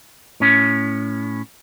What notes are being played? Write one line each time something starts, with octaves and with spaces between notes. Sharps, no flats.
A2 C#4